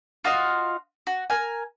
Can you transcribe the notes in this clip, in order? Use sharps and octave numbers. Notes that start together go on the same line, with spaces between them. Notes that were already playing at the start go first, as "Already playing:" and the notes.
F4 F#4 D#5 F5
F#4
A#4 G#5